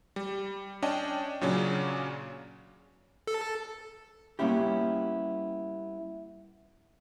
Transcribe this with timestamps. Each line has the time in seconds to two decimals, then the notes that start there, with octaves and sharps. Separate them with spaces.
0.16 G3
0.82 C#4 D4 D#5 G5 A5
1.41 A#2 C#3 F#3 C#4 D4
3.27 A4
4.39 G3 A#3 B3 C#4 E4 G4